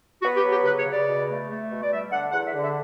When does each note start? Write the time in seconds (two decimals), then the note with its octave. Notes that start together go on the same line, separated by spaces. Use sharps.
0.22 B3 F#4
0.36 G4
0.43 F#3
0.50 G4
0.64 C#3 B4
0.78 C#5
0.85 C#3
0.92 D5
1.06 B2
1.27 A3
1.49 A3
1.70 B2
1.81 D5
1.90 G3 E5
2.11 D3 F#5
2.32 E2 F#5
2.46 E5
2.53 D3
2.61 E5